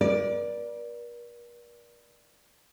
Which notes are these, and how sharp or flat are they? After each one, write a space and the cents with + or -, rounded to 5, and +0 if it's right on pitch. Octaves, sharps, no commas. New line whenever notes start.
A#4 +45 D5 +0